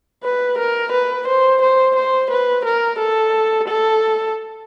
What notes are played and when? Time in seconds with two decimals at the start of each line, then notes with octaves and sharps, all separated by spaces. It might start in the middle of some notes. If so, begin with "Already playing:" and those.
0.24 B4
0.58 A#4
0.92 B4
1.28 C5
1.62 C5
1.96 C5
2.31 B4
2.65 A#4
2.99 A4
3.68 A4